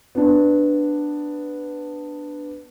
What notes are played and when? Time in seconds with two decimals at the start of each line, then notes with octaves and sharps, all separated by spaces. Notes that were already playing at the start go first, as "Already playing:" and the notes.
0.15 B3 D4